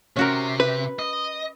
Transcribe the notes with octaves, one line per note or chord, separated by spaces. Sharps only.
C3 C#4 F#4 A#4
B4
D#5